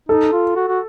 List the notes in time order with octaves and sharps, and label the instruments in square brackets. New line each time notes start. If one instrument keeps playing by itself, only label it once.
[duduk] D#4 [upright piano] A4
[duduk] F4
F#4
F#4